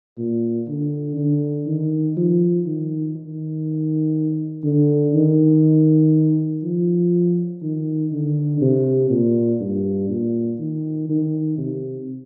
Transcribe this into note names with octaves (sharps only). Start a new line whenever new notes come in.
A#2
D3
D3
D#3
F3
D#3
D#3
D3
D#3
F3
D#3
D3
C3
A#2
G2
A#2
D#3
D#3
C3